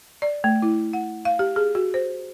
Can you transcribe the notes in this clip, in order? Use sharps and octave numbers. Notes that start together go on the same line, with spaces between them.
D5
A3
E4
F#5
F5
G4
G#4
F#4
C5